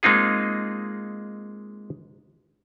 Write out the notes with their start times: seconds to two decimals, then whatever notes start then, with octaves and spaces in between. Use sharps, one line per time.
0.03 G#3 A#3 C4 D#4 F4 G#4